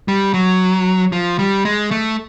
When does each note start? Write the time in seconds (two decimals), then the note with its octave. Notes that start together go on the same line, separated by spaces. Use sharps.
0.08 G3
0.34 F#3
1.12 F3
1.39 G3
1.65 G#3
1.91 A3